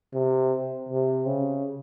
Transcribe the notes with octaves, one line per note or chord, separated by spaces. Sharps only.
C3
C3
C#3